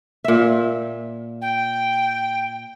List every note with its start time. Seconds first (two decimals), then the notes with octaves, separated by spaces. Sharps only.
0.24 A#2 E5
1.41 G5